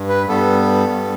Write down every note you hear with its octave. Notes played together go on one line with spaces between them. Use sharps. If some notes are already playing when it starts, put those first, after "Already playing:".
Already playing: G2
B4
G2 G3 B3 A4
G2 G3 B3